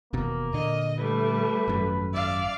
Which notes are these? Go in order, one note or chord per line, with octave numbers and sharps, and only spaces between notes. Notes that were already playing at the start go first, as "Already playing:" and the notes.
E1 D#2 B2 A#3
A#2 D3 D#5
G3 A3 B4
G#1 F#2
D5 E5 F5